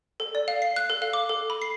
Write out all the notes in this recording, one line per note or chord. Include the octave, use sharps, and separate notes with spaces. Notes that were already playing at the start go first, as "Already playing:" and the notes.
A4
D5
F5
C7
F#6
A4
F5
D6
A4
B5
C7